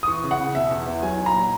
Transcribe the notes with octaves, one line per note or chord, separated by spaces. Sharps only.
D#6
E3 C#6
C#3
F#5
C#3
B2 E5
E2
E2
F#3 G#5
D#4
A#5
A#2